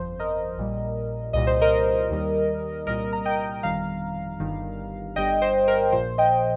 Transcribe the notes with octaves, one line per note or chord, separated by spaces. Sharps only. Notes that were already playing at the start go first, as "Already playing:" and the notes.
Already playing: G1 F2 F3 C5
A#4 D#5
A#1 A#2 G3
C2 A#2 G3 D#5
C5
A#4 D#5
D#2 D#3 G3
C2 A#2 G3 A#4 D#5
A#5
D#5 G5
G1 F2 D#3 G3 F5 A#5
G1 G2 D#3 G3
G1 G2 G3 D#5 G5
C5
A#4
A#1 A#2 F3 C5
D#5 G5